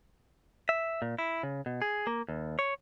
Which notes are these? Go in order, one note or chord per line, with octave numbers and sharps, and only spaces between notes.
E5
A#2
E4
C#3
B2
G#4
A#3
D#2
C#5